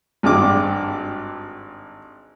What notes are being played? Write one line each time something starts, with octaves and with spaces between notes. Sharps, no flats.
G#1 G2 D6